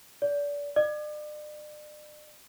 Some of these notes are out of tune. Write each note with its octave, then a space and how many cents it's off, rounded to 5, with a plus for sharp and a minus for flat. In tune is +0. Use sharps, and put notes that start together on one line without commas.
D5 -30
D5 +40